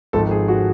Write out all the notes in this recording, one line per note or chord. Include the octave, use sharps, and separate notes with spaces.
G#1 G#2 F3 A4
G#4
F#4